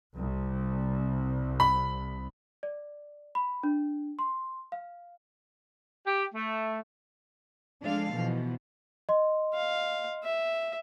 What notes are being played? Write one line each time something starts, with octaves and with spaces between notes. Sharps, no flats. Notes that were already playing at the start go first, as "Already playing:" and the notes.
C2
B5
D5
B5
D4
C6
F5
G4
A3
F3 G#3 D4 A4 F5
B2 E3 F3
D#5 C6
F5
E5